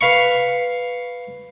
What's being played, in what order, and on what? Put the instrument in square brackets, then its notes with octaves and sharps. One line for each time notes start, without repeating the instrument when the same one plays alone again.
[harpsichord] B4 F5 B5 C#6